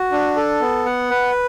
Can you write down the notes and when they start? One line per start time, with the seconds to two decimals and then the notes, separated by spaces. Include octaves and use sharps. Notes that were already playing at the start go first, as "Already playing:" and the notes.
Already playing: F#4
0.12 D4
0.36 A4
0.61 B3
0.86 F#5
1.10 B4